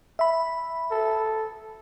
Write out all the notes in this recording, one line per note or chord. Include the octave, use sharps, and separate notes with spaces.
E5 B5
A4